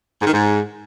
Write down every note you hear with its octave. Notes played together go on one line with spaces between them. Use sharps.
G#2
D#3
G#2